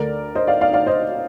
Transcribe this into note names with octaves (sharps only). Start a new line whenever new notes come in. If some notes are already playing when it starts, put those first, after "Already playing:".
Already playing: D2 D3 A3 A#4 D5
C5 D#5
D5 F5
D5 F5
D5 F5
C5 D#5